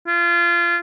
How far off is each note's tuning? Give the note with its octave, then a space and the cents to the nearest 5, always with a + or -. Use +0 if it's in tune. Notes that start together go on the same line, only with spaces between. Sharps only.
F4 -25